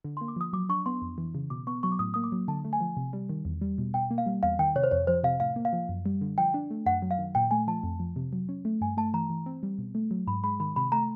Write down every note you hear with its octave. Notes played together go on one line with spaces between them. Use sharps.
D3
C6
A#3
D6
F3 D#6
F#3 D6
D4 C#6
B3 C6
F2
E3
C#3
B2 D6
B3 C#6
F#3 C#6
D6
A2 D#6
A#3 D#6
D6
F#3
D3 A5
A3
G#5
F3
C3
G3
D#3
E2
G3
B2
B2 G5
A#3
F5
G3
E2 F5
D#3 G5
C3 C#5
C5
F2 C#5
F3 C5
C3 F5
A2 F5
A#3
F5
F3
F#2
G3
D3
F3 G5
D4
A3
F#2 F#5
F#3
F5
D#3
A#2 G5
A3 G#5
F3 A5
F2
F3
C3
F#3
C#4
A3
G2 G#5
A3 A5
E3 A#5
E3
C4
G3
B2
A3
F#3
G#2 B5
G#3 B5
D#3 B5
C3 B5
A3 A#5